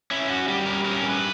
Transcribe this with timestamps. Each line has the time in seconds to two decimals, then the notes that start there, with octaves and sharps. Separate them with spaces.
0.11 C#4 E4
0.30 F#4
0.48 G3 G4
0.66 A#4
0.84 C#4 A#4
1.09 B4